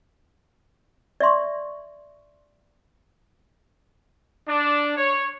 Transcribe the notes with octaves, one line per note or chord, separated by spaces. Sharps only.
D5 E5 C6 C#6
D4
C#5